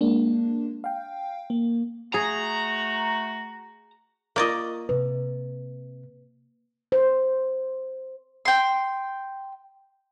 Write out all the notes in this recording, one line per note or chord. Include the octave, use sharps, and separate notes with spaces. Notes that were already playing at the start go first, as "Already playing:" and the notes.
G#3 A#3 D4
F5 G5
A#3
A3 F#4 G#4 A#5
A#3 F4 A#4 D5 D#5 C#6
C3 B4
C5
G5 C6